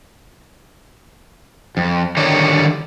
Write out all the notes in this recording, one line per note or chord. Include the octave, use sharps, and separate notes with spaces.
F2
D3 D#3 G3 D#4 C#5